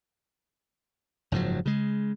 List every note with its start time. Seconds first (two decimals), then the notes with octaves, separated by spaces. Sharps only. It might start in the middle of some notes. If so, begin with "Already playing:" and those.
1.32 F#1 G#2 F3 F#3
1.66 C#3 G#3